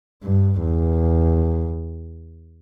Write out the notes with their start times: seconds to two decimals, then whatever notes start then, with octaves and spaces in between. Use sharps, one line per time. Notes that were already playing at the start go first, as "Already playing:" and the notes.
0.24 G2
0.63 E2